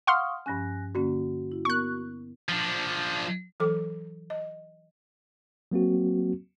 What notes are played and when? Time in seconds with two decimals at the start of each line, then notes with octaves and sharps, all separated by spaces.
0.07 F5 F#5 C6 C#6 D#6 F6
0.46 G2 F3 C#4 G#5 F#6 A#6
0.95 D3 A#3 C#4 F#4
1.52 E4
1.65 B3 A#4 C#6 F#6
2.49 F3 D4
3.60 E3 F#3 A4 D6
4.30 D#5
5.71 F#3 A#3 C4 F#4